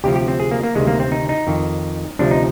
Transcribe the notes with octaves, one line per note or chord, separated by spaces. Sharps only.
D2 C3 F3 G4
G4
C4
G#4
A#3
A#3
D2 C3 D#3 G#3
A#3
C4
D#4
D#4
F2 D#3
D2 C3 F3 D4
D#4